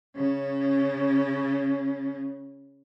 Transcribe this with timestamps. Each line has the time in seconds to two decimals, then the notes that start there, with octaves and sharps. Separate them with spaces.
0.16 C#3 C#4